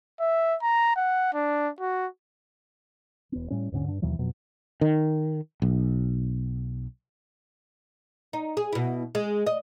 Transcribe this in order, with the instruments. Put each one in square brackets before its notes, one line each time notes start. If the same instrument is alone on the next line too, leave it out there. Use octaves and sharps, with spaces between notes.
[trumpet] E5
A#5
F#5
D4
F#4
[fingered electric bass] E1 B3
A2 G3 C#4
D#1 G#2 D3 C#4
G2 D4
D#2 B2 E3 F#3
F2 B2 F#3
[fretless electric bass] D#3
B1
[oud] D#4
G#4
B2 E4
G#3
D#5